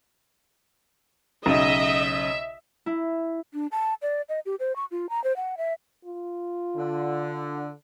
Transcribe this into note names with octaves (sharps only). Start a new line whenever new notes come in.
B1 C#3 D#5 E5 E7
E4
D4
A5
D5
D#5
G4
C5
C#6
F4
A#5
C5
F#5
E5
F4
D3